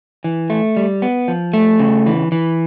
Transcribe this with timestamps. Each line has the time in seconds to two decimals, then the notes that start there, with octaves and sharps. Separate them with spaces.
0.24 E3
0.50 A3
0.77 G3
1.02 B3
1.28 F3
1.54 A3
1.79 C#3
2.06 E3
2.32 E3